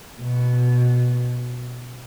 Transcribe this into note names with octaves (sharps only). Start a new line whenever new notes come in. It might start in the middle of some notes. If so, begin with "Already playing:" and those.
B2